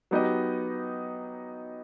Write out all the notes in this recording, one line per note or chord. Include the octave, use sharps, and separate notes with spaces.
F#3 B3 D#4 G4 D#5